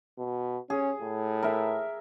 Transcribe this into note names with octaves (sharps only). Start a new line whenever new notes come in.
B2
C#4 G#4
A2
A#4 E5